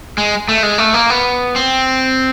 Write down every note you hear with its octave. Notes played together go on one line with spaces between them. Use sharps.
G#3
A3
G#3
A3
A#3
B3
C4